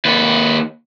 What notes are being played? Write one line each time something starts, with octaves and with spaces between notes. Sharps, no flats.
D#2 B4